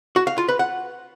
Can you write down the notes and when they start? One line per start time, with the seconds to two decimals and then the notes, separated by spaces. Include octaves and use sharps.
0.16 F#4
0.27 F5
0.38 F4
0.49 B4
0.59 F#5